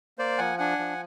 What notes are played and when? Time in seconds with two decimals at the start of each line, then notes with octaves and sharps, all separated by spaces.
0.18 A#3 C5 D5
0.38 F3 F#5 G#5
0.58 D4 F#5 G#5
0.79 F3